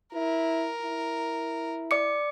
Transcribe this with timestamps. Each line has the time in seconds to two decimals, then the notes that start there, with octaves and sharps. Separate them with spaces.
0.13 E4 A#4
0.81 E4
1.91 D5 D6 C#7